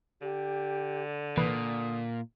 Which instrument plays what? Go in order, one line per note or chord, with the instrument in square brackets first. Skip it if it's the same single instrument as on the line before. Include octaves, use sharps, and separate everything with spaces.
[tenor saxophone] D3 [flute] G4
[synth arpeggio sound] C2 E3 B4 [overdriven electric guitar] A#2 [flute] D#6